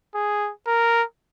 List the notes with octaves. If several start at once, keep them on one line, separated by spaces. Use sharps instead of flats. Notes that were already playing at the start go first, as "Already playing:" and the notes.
G#4
A#4